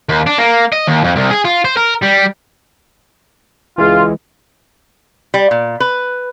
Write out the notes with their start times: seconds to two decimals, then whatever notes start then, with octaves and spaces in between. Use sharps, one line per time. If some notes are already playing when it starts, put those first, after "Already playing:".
0.09 D#2
0.27 D4
0.38 A#3
0.72 D#5
0.87 D#2
1.04 F2
1.16 C2
1.31 G#4
1.45 F4
1.65 C5
1.77 A#4
2.03 G3
3.78 C#2 E3 G#3 F4
5.34 G3
5.51 A#2
5.80 B4